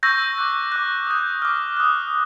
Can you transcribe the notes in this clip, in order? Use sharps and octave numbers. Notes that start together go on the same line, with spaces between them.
C#6 E6 G6 A#6
D6 F#6
D6 F#6
D#6 G6
D6 F6
D#6 F#6